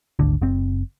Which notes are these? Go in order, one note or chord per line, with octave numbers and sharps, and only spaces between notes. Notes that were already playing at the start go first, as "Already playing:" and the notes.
G#1 D2 D3
F#1 C4